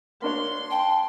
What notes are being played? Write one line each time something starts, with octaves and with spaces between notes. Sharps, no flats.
A#3 D4 C#5 C6
G5 A5